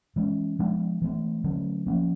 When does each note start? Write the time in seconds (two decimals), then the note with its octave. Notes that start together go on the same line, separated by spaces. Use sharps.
0.16 E3 G#3 C#4
0.59 F3 G#3 B3 D4
1.02 E3 A3 C4
1.44 D3 F#3 A3 C#4
1.87 F3 A#3 C#4